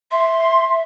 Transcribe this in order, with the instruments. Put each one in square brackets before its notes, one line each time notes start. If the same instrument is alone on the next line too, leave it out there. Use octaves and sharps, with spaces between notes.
[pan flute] E5 [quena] C6